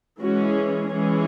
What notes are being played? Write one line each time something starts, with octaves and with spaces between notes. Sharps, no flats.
E3 G#3 C#4 F#4
G#4
E3 G#3 C#4